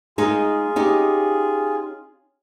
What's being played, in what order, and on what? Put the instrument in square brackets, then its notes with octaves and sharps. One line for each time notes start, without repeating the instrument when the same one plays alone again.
[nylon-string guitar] G#3 D#4 [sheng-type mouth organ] F4 G#4
[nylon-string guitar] C#4 D#4 G4